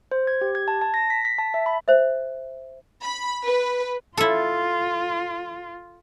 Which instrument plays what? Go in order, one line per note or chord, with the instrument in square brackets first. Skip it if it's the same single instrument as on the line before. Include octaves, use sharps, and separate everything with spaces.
[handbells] C5
G#6
G4
G#6
A5
A5
A#6
B6
B6
A5
E5
B5
[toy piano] C5 E5
[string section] B5
B4
[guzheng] E4 A4 [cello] F4